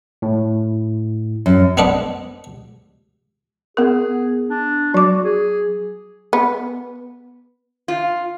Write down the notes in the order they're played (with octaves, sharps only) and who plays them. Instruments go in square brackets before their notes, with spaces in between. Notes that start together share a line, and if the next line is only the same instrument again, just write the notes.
[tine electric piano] A2
[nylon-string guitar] F#2
[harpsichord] B3 C4 D4 B4 D#5 F#5
[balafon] B3 A#4 [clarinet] G#4
[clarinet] D4
[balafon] F#3 D6 [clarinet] F#4
[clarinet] G#4
[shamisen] B3
[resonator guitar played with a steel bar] F4